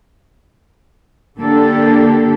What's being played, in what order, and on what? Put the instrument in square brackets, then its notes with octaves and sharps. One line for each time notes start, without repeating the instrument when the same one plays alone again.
[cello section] D3 A#3 D4 G4 A4